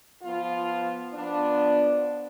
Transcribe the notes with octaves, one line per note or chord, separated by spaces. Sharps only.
F3 B3 F4
F3 B3 D4